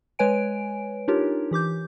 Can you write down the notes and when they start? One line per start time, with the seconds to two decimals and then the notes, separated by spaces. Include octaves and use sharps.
0.19 G#3 B4 C#5 G#5 D7
1.08 D4 D#4 F4 G4 A#4 C#5
1.51 E3 G4 D6 G6